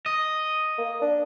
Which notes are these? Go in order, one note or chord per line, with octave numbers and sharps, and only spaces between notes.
D#5
A#3
D4